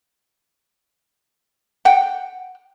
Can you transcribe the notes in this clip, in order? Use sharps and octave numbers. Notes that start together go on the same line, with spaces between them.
F#5 G5